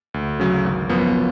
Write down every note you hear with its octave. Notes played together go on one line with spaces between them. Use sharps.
D2
C#3 F#3 C#4
G#1
F#2 F3 B3